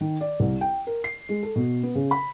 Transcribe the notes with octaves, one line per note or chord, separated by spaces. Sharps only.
D#3
D5
C2
G5
A#4
C7
G#3
A4
B2
B3
C#3
B5